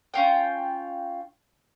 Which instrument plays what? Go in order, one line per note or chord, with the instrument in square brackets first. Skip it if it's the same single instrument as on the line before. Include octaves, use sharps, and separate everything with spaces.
[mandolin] C#4 F4 G5